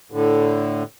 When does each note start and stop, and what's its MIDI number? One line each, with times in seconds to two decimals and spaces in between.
0.12 0.83 45
0.12 0.83 50